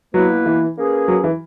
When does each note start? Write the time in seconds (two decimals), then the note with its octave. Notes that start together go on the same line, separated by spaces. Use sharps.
0.14 B2 F#3 A#3 E4 B4
0.46 E3
0.76 A#3 C#4 G#4 B4
1.08 F#3
1.24 E3